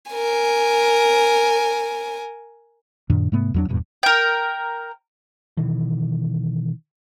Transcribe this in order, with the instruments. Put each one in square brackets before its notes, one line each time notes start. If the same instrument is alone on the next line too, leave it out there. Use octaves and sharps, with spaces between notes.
[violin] A#4 G#5
[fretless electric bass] F#2 A#2 D#3 D4
G#2 C3 A3 B3
E2 F#3 D4
D#1 E2 G2 A#2
[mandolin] A#4 G5
[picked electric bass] B2 D#3 E3